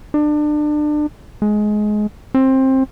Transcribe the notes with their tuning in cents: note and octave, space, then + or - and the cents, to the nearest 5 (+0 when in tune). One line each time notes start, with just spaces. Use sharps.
D4 +30
G#3 +20
C4 +20